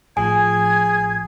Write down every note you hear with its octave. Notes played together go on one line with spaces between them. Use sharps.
A1 A2 F3 G#4 G#5 G#6